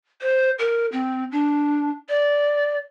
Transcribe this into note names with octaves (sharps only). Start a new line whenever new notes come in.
C5
A#4
C4
D4
D5